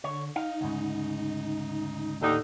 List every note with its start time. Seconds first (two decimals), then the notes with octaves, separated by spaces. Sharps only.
0.04 D3 C#5
0.36 D#4 F5
0.61 D2 G#2 C#3
2.22 D#2 A2 D3 D#4